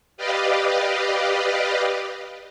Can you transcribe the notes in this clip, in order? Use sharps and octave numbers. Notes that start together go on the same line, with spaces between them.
G4 B4 D5 D#5 F5